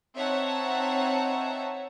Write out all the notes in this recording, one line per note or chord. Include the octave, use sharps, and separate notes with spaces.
C4 D#4 C#5 E5 F#5 A5